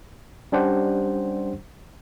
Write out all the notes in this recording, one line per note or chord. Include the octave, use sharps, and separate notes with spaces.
G3 C#4 D4 G4 C5 F#5